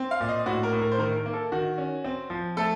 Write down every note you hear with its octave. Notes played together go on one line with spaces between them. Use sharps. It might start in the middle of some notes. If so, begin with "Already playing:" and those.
Already playing: C4
F5
A#2
D#5
A2 F#4
A#4
A2
A#4
C5
D#3 A#4
A#4
A#3
A4
D#3 F#4
C#4
C4
F3
A3 A4